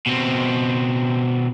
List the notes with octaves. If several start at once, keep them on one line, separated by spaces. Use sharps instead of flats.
B2 C4